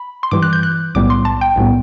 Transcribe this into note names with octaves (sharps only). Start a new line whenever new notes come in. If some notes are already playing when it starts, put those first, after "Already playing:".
Already playing: B5
C6
G2 E3 G3 D6
F#6
G6
F#6
B1 A2 G3 B3 D6
C6
A5
G5
B1 A2 G3 B3